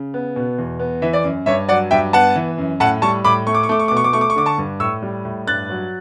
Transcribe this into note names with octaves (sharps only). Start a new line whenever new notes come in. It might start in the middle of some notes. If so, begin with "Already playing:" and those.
Already playing: C#3
B3
B2
E2
B3
E3 E5
D5
F#2
G2 C#5 E5
F#3 D5 F#5
G2 E5 G5
B3 F#5 A5
E3
F#2
A2 F#5 A5
G3 A5 C#6
A2 B5 D6
A3 C#6
D6
C#6
A3 D6
C#6
B2 D6
C#6
D6
A3 C#6
D6
C#6
D3 D6
A5 C#6
G2
A2 C#6 E6
G3
A2
G2 F#6 A6
F#3